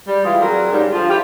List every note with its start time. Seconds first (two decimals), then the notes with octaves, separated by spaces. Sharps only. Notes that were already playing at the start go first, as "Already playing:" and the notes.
0.07 G3
0.24 E3 G3 G#3 F4
0.40 F#3 G3 C4 G#4 A#4
0.71 G#2 C#3 G3
0.92 D3 F3 F4
1.09 E4 F4 G4